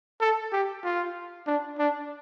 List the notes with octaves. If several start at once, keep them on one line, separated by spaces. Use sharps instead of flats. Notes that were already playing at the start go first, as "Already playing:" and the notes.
A4
G4
F4
D4
D4